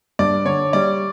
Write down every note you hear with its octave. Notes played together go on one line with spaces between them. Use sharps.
G2 D5
D3 C#5
G3 D5